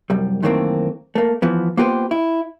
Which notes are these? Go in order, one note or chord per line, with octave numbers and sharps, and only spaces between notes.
C2 F#2 G3
F#2 D#3 E3 A3 A#3 C4
A3 A#3
E3 F3 B3
A#3 B3 F4 G4 B4 C5
E4